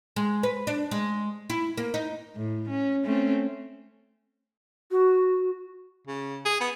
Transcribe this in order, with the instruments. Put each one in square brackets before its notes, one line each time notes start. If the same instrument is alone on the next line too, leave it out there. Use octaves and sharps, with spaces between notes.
[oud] G#3
B4
D4
G#3
E4
A#3
D#4
[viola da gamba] A2
C#4
A3 C4 C#4
[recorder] F#4
[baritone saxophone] C#3
G#4
B3